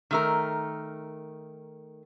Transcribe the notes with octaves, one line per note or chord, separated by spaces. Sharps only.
D#3 A3 A#4